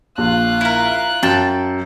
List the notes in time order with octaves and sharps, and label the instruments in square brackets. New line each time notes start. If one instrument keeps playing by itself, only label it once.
[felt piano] A#1 [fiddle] F4 F#6
[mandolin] E4 A#4
[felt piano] F#2 [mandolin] G5 A5